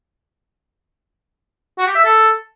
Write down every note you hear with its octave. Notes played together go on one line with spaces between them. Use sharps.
F#4
G4
E5
A4